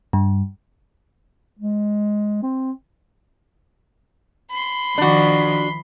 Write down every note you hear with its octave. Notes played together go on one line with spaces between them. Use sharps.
G2
G#3
C4
B5 C6
D#3 F3 D4 F#4